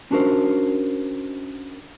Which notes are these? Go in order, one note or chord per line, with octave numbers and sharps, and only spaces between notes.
C#4 D4 F#4 A#4 C5